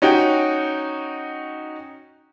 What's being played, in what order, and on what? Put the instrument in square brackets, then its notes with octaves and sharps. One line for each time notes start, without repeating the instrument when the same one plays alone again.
[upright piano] C#4 D#4 F#4 G5